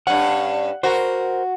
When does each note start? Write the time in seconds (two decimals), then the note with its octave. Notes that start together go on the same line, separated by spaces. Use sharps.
0.07 G2 C#4 F#5
0.83 F#4 A#4 C5